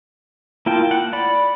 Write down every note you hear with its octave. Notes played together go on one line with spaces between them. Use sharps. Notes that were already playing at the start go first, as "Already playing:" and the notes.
A#3 E4 F4 G5 A5
F#5
D5 B5